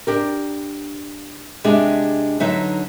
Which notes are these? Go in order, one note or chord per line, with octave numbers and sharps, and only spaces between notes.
D4 G4 A#4
C3 G#3 D4 G4 G#4 E5
D3 F#3 D#4 B4 D#5 E5